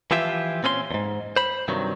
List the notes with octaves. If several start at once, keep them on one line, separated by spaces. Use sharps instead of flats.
E3 F3 E4 F4 G4 E5
A#2 C4 C#4 B4 C6
E2 G#2
C5 B5
G2 C3 D#3 F#3